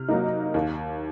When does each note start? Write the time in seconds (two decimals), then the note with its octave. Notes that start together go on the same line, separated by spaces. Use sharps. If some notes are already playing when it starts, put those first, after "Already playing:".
Already playing: C3 F6
0.08 F#3 A#3 D#4
0.54 D#2